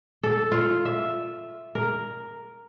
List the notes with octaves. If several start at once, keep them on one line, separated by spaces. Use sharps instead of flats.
A4
F4
E5
A#4